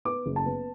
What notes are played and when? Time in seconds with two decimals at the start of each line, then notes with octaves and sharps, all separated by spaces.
0.05 B3 D6
0.26 F#1
0.36 A5
0.46 B3